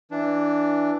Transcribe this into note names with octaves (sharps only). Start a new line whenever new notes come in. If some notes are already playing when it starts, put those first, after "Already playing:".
E3 D4